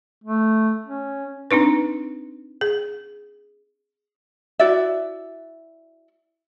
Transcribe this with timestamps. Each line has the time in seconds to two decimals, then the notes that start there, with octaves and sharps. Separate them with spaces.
0.24 A3
0.86 C#4
1.51 C4 D4 D#4 B4
2.61 G#4
4.59 E4 F#4 D5 E5